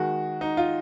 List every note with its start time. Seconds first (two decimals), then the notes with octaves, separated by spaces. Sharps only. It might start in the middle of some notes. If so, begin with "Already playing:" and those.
Already playing: D#3 G#3 F#4
0.41 D#4
0.57 F4